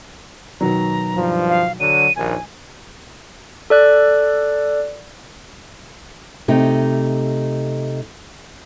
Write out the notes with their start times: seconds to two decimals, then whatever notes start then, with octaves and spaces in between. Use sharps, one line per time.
0.61 B2 D#3 F#3 A#5
1.15 G2 F3
1.49 F5
1.80 D3 F#3 D#7
2.16 A#1 D#2 G#5
3.70 A4 D5 F#6
6.48 C3 A3 D#4